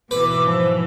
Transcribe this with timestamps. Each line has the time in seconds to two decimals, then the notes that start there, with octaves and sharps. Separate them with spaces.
0.11 G#2 B2 E3 B4 D6
0.47 F3